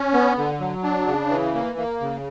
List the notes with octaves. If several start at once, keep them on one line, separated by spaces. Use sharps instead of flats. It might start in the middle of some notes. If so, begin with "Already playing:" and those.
Already playing: C#4
B3
D3
F#3
D4
C#3
E3
A#3
A#3
C#3